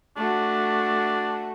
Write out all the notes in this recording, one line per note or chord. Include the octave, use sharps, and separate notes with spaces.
A3 D4 F#4